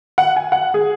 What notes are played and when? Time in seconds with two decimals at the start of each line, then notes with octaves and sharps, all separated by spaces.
0.18 F#5
0.36 G#5
0.52 F#5
0.74 G#4